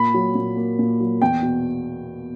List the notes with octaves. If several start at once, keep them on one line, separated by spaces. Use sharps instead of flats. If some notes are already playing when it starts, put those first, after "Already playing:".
Already playing: A#2 B5
F#3
A#2
A#3
A#2
F#3
E2 G5
B2